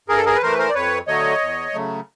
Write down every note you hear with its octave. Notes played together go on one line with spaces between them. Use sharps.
G2 G#4 A#4
A4
G#4 A#4
B4
E3 A3 A#4 C5
B4
A#4 C5
D5
F2 B4 C#5
D3 F#3 A3 C#5 D#5
E2
C#3 F#3 A3